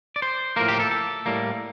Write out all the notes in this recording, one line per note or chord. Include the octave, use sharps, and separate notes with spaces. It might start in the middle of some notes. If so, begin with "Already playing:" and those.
D5
C5
A2 F3 A#3 A#4
G4
A4
A4
A2 G3 A#3